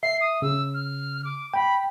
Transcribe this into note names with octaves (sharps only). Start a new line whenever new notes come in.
E5 C7
D#6
C#3 E6
F6
D6
G5 B5